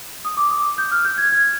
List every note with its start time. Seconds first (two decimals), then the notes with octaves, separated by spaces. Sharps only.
0.25 D#6
0.37 D6
0.50 D#6
0.78 G6
0.91 F6
1.05 G6
1.18 G#6
1.32 G#6